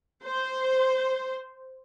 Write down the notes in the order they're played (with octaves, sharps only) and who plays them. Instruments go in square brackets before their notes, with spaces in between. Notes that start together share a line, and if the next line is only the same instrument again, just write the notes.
[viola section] C5